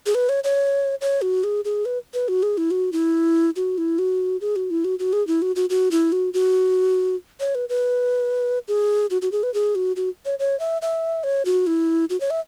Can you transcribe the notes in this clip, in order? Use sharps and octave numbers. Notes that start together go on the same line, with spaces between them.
G#4
B4
C#5
C#5
C#5
F#4
G#4
G#4
B4
B4
F#4
G#4
E4
F#4
E4
F#4
E4
F#4
G#4
F#4
E4
F#4
F#4
G#4
E4
F#4
F#4
F#4
E4
F#4
F#4
C#5
B4
B4
G#4
F#4
F#4
G#4
B4
G#4
F#4
F#4
C#5
C#5
E5
E5
C#5
F#4
E4
F#4
C#5
E5